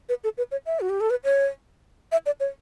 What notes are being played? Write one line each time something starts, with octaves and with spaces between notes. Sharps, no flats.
B4
A4
B4
C#5
E5
F#4
G4
A4
B4
C#5
E5
D5
C#5